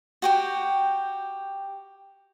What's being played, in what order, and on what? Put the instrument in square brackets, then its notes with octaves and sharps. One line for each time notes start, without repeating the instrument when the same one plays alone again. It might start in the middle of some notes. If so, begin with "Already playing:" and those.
[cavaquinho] F#4 G4 G5